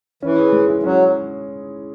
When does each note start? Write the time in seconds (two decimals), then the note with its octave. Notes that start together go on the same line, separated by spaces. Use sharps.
0.23 E3 C#4
0.38 G#4
0.52 G#3
0.68 E4
0.83 F#3 C#4